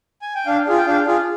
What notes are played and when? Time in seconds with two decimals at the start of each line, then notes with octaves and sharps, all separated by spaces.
0.22 G#5
0.35 G5
0.46 D4 F5
0.67 F4 G#4
0.78 G5
0.86 D4 F5
1.07 F4 G#4